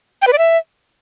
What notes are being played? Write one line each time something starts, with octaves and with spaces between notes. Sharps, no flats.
G5
B4
D5
E5